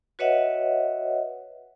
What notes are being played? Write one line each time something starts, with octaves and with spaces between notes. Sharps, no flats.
F#4 B4 C#5 D#5 E5 F#5